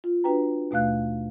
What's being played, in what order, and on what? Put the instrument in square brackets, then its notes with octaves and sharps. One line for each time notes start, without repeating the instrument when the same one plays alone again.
[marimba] F4
D4 F#4 B4 G5 A#5
D#2 B2 A3 F5 F#6